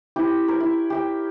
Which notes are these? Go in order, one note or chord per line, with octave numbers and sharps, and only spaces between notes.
E4 G4 G5
A#4 C#5 G5
E4
G4 E5 G5